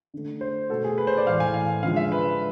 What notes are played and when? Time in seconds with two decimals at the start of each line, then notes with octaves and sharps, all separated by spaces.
0.14 D3 A3
0.41 C5
0.70 B2 A3 A4
0.84 G#4
0.98 B4
1.07 C5
1.17 D5
1.26 A2 E3 A3 F5
1.40 G#5
1.54 F5
1.83 D3 F3 G#3 F5
1.96 E5
2.12 B4